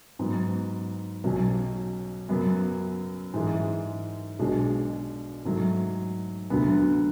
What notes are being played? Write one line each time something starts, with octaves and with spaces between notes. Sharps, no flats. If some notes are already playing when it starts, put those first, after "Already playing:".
G#2 F#3 B3
B1 B2 F#3 C#4
F#2 C#3 F#3 B3
G#2 E3 G#3
B1 B2 G#3 D4
G#2 F#3 A3
D2 D3 F#3 B3